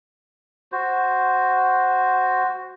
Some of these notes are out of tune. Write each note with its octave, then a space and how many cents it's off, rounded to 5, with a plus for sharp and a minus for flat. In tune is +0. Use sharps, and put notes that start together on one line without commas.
F#4 +0 C5 +0